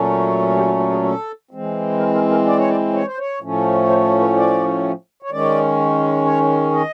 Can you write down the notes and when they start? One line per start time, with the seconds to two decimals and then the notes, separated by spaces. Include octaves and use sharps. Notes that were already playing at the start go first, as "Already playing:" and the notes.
Already playing: A#2 F#3 A3 C#4
0.57 G4
0.63 F4
0.68 F#4
0.80 F4
0.92 G#4
1.03 A4
1.51 E3 G#3 C4
1.99 A#4
2.15 A#4
2.30 A#4
2.46 D5
2.58 C#5
2.69 D5
2.94 C#5
3.06 C5
3.18 C#5
3.41 A2 F3 A3 C#4
3.89 C5
4.20 B4
4.36 D5
5.23 C#5
5.31 D#3 G#3 C#4 D5
6.25 C#5
6.73 D#5